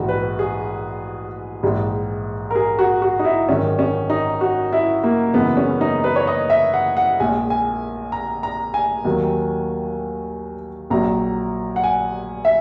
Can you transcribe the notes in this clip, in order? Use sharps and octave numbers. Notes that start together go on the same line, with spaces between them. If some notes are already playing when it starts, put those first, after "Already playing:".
Already playing: A#1 G#2 E3 F#4
B4
G#4
A#1 G#2 E3 G#3
A#4
G#4
F#4
F#4
D#4
E4
G#1 F#2 D#3 G#3 C#4
C#4
D#4
F#4
E4
A#3
F#1 F#2 E3 G#3 B3
C#4
D#4
B4
C#5
D#5
E5
F#5
F#5
A#1 A#2 G#3 G#5
G#5
A#5
A#5
G#5
D#2 D#3 F#3
A#1 A#2 F#3 A#5
F#5
G#5
E5